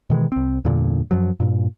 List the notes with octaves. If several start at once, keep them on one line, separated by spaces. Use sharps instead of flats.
B2 D#3 E3 G#3
C2 C4
E2 G2 A#2 D3
F#2 F3 F#3
G2 A#2